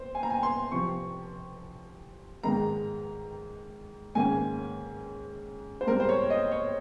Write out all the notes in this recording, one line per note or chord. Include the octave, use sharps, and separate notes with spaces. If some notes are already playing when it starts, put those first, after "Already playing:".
Already playing: C5
G#5
A#5
G#5
C6
C3 F3 C4 C#6
G#2 D#3 G#3 A#5
G#2 D#3 A#3 C#4 G#5
C5
G#2 G3 C4 A#4
C5
C#5
D#5
C#5